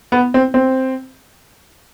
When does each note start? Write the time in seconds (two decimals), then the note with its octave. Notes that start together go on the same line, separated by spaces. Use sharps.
0.12 B3
0.34 C4
0.54 C4